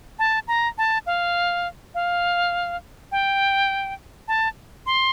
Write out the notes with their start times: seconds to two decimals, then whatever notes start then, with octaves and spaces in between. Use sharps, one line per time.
0.19 A5
0.48 A#5
0.78 A5
1.06 F5
1.95 F5
3.12 G5
4.28 A5
4.86 C6